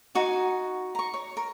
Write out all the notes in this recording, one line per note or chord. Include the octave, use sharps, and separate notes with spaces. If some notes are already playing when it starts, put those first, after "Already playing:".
D#4 F#4 F#5 G#5
A#5 C#6
C#5
A#4